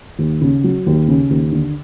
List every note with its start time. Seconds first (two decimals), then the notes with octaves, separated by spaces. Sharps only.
0.19 D#2
0.41 C#3
0.64 F#3
0.86 D#2
1.08 C#3
1.30 D#2
1.52 D3